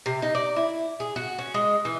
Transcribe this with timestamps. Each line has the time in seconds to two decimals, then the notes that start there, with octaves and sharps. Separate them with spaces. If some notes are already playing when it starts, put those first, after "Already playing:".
0.06 C3
0.22 D#4
0.35 D5
0.56 E4
1.00 G#4
1.16 F#4
1.39 C#4
1.54 G#3
1.85 E3